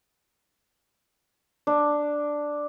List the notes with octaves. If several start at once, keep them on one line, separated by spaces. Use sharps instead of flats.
D4